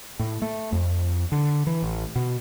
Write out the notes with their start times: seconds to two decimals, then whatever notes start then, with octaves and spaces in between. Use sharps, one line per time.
0.19 A2
0.42 A3
0.72 F2
1.32 D3
1.67 E3
1.82 A1
2.16 B2